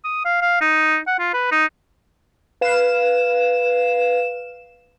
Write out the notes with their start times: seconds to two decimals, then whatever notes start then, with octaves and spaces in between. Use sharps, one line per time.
0.04 D#6
0.25 F5
0.42 F5
0.61 D#4
1.07 F#5
1.19 F4
1.34 B4
1.51 D#4
2.61 B4 F5 E7